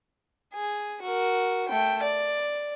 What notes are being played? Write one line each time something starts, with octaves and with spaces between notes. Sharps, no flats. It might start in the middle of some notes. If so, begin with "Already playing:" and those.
G#4
F#4 A#4
A3 G5
D5